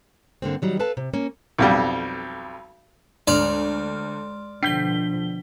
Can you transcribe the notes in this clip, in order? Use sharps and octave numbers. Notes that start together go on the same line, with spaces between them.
G2 D3 A#3 C4
D#3 F#3 G3
A4 B4 F5 A5
C3
A#3 C#4
B1 F2 G3
D2 G#3 D5 C6 F6 F7
B2 D3 F3 D4 G6 B6 C7 G7